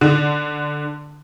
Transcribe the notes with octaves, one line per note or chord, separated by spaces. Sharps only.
D3